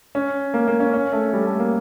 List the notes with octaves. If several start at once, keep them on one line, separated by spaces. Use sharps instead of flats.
C#4
A#3
A#3
C#4
C#4
A3
G3
A3
A#3